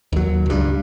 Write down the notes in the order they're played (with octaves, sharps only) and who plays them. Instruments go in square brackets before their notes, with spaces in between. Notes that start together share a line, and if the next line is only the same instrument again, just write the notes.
[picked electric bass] D#2 F#3
C#2 G2